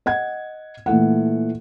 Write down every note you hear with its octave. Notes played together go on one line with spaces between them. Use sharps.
D#5 F#5 G#6
A#2 E3 A3 F#5